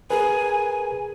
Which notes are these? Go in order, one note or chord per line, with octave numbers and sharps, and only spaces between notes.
G#4 A#4 B4 G#5